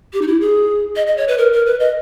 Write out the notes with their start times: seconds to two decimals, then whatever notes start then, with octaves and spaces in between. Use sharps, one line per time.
0.13 G4
0.22 D#4
0.27 E4
0.41 G#4
0.96 D#5
1.07 D#5
1.17 C#5
1.28 B4
1.38 A#4
1.53 A#4
1.66 B4
1.80 D#5